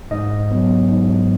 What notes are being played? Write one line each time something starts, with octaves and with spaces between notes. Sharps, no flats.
G#2 D#5
F#3 B3
G#2